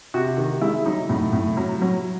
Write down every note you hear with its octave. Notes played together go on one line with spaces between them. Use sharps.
C3 F#4
D#3
G#3 E4
F#3 D#4
A2
A2
F#3
F#3